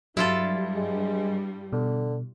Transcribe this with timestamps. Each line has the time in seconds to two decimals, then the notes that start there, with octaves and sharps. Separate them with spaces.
0.17 G2 F#3 G3 E4 F4 A4
0.76 G#3
1.73 B2 D3